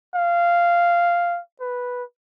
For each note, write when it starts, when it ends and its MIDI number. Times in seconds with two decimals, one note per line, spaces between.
0.15 1.40 77
1.61 2.03 71